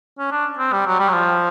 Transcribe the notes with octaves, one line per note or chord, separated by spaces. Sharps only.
C#4
D4
C4
G3
F#3
G3
F#3
F3